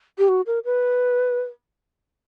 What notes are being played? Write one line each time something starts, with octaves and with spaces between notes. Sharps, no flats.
G4
F#4
A#4
B4